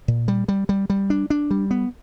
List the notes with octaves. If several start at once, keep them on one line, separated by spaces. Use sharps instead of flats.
A#2
G3
G3
G3
G3
D4
D4
G3
B3